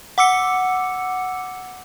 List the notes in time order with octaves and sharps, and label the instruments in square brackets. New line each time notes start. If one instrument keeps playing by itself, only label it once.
[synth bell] F#5 D6 E6 C#7